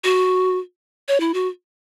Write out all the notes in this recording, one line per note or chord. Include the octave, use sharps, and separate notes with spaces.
F#4
C#5
E4
F#4